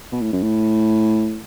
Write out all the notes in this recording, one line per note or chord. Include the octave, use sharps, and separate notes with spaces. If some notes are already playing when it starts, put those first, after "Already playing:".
B2
A2
F#2
A2